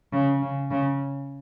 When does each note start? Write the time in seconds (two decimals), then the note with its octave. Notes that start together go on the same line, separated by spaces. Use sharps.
0.13 C#3
0.42 C#3
0.71 C#3